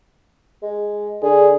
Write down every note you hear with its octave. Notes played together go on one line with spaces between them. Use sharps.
G#3
D3 G#4